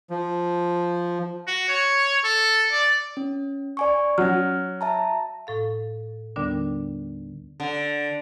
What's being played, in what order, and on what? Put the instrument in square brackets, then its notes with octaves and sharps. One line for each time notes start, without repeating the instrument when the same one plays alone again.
[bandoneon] F3
[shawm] F#4
C#5
A4
D5
[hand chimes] C#4
D5 G#5 C#6
[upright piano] F#3 [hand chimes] C#4 F6
[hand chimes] E5 A5 A#5
[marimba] A2 A4 F5
D#2 D3 G3 B3 D4 A#4
[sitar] D3